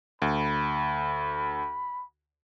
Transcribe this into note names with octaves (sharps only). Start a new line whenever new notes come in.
D2 B5